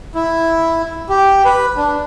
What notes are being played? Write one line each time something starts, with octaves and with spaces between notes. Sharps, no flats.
E4
G4
B4
D4